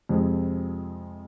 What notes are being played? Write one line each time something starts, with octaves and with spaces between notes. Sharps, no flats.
F2 C3 F3 G#3 C4